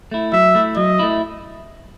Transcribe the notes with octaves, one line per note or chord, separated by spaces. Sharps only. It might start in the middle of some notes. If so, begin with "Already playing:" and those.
A3 E4
F#3 E5
A3 E4
F#3 D#5
A3 E4